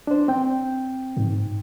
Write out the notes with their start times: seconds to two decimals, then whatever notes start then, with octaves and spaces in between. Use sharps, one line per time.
0.07 D4 C5
0.28 C4 G5
1.17 G#2